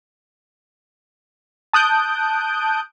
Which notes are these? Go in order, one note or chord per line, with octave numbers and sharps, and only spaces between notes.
A5 D#6 F#6 G6 D7